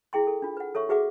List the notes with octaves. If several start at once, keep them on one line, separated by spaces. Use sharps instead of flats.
E4 G#4 G5 C6
A4
D4 F4
B4 F#5
A4 C#5 E5 C#6
F#4 G#4 B4 E5 F#5 D6